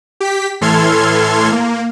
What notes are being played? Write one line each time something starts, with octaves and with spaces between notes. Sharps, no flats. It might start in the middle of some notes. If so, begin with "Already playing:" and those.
G4 B6
A2 E3 A4 C6 F6 G#6
A#3